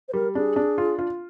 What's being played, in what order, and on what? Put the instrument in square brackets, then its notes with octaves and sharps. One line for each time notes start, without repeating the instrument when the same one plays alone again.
[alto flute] C5
[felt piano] G3 [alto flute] A#4
[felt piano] D4 [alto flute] G#4
[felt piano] D4
F4
F4